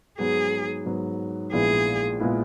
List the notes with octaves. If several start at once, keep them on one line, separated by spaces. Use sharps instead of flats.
G#2 F#3 B3 G#4
G#2 F#3 B3
A#1 A#2 G#3 B3 E4 G#4
A#2 G#3 B3 E4